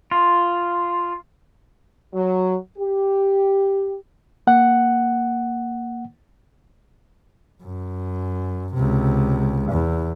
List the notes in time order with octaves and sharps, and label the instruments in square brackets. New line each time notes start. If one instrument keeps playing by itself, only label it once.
[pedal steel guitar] F4
[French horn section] F#3
G4
[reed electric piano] A#3 F#5
[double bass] F#2
C#2 C3
E2